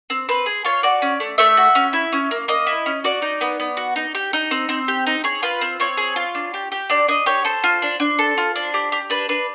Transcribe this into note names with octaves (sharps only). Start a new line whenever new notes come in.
C4
C4 B4
G#4
F4 C#5
F#4 D5
C#4
A3
A3 E5
F#4
C#4
E4
C#4
A#3
A#3 D#5
E4
C#4
F#4 D5
D#4
B3
B3
F#4
D#4
G4
D#4
C4
C4
G4
D#4
G#4 C#5
F4 B4
C4
C4 C#5
G#4
F4
D4
G4
G4
D4 D5
D4 D#5
G4 C#5
A4 C5
F4
D4
D4
A4
F4
D4
G4
G4
D4 B4
D4 B4